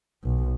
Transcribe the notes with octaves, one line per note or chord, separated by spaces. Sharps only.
B1